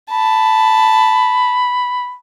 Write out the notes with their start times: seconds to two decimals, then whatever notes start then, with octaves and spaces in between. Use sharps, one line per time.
0.11 A5 B5